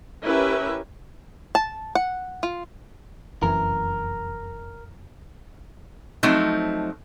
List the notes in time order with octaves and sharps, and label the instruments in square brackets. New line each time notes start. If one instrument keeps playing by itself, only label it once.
[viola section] C#4 E4 G4 A#4 B4 E5
[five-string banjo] A5
F#5
F4
[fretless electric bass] F1 F#2 E3 [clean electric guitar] A#4
[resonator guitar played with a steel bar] F3 F#3 A3 C4 D#4